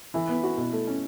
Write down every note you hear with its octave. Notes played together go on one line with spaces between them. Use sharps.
E3 E4
B3
F#4
B2
A3
C#4